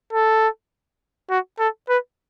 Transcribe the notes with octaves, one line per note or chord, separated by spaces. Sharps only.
A4
F#4
A4
B4